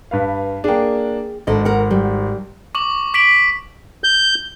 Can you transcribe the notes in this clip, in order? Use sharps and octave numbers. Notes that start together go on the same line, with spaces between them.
G2 B4 F5
A#3 D4 G#4 G5
G#1 D4 A4 D#5
A#4 F#5
G3
C#6 D6 F#7
D6 B6 D7 F#7
G6